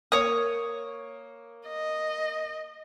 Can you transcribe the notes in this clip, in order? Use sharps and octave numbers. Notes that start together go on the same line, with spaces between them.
A#3 C#5 D#6 C#7
D#5